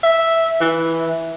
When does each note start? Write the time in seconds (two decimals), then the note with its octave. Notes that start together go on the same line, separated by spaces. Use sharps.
0.03 E5
0.60 E3